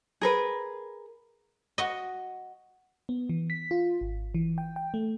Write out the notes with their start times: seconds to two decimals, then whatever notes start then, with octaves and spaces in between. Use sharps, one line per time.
0.21 G#4 A#4 B4
1.78 F#4 D#5
3.09 B3
3.29 E3
3.50 B6
3.71 F4
4.01 G#1
4.35 E3
4.58 G5
4.76 G5
4.94 A3